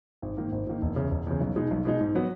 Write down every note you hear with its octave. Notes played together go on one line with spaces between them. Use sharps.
G#1
G#2 D#3 A#3
G#1
G#2 D#3 A#3
E1
E2 C#3
E1
E2 C#3
B1
B2 G#3 D#4
B1
B2 G#3 D#4
G#2
F#3 B3 F#4